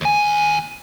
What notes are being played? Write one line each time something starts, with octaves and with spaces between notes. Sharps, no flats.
D#2 G#5